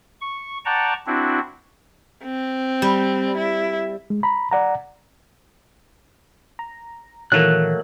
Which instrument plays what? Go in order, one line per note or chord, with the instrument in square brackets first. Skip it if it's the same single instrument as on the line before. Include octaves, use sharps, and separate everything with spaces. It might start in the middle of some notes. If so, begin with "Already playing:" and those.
[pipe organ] C#6
D5 F#5 G5 A5 A#5 C#6
C4 D4 E4 F#4
[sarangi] C4
[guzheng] G3
[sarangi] E4
[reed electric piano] G#3
A#5 B5
D5 F#5 A#5
[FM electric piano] A#5
[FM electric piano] A#2 D#3 E3 [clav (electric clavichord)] F#3 A3 A#3 [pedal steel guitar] F#6